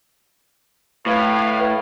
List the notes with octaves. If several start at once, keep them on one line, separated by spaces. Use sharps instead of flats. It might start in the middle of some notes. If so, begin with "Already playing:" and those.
A2 B4 F5